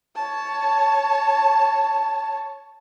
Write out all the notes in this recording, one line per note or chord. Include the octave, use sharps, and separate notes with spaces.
C#5 A5